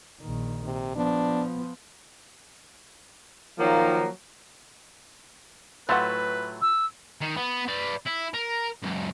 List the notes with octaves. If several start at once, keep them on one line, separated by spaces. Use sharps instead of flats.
A#1 D#3
C3
F3 B3 D4
D#3 F3 F#3 A#3
A2 F#3 A3 F4 B4 F#5
E6
D#3
B3
B4 D5
E4
A#4
C#2 F#2